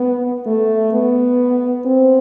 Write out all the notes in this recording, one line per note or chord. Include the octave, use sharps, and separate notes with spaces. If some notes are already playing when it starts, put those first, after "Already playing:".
Already playing: B3
A3
B3
C4